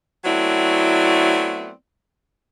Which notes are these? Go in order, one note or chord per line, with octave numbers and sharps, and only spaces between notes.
F#3 A3 B3 C4 E4 D5